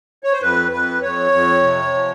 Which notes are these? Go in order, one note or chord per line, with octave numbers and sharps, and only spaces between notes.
C#5
C5
F2 B4
F2 B4
F2 C#5
F2
C3
F3